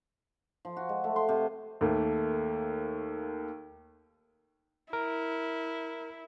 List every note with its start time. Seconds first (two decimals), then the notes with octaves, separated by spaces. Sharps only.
0.65 F3
0.77 F#4
0.89 G#3
1.04 A3
1.16 C6
1.29 C3
1.81 D#2 A3 A#3
4.93 E4 A#4